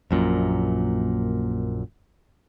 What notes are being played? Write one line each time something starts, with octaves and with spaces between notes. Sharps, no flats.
A#1 F#2 A#2